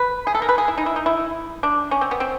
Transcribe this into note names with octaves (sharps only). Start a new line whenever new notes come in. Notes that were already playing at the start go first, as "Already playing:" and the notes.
Already playing: B4
G#4
A4
A#4
B4
G#4
E4
D#4
E4
D#4
E4
D4
C#4
C4
B3
C4